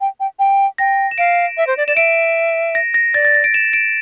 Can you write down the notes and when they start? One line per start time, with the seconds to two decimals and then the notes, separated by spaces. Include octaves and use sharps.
0.01 G5
0.20 G5
0.39 G5
0.78 G5 A#6
1.11 E7
1.18 F5 D7
1.57 E5
1.67 C5
1.77 D5
1.87 D5 E7
1.96 E5 D7
2.75 A#6
2.94 A#6
3.14 D5 A6
3.25 A6
3.34 A#6
3.44 D7
3.54 E7
3.73 D7